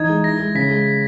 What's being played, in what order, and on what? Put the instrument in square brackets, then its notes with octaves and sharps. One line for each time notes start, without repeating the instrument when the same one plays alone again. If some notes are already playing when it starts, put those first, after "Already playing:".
Already playing: [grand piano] E3 D#4 [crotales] G#6
[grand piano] G#3
[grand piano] E4 [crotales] A#6
[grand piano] G#3
[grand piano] C#3 [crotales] B6
[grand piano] G#3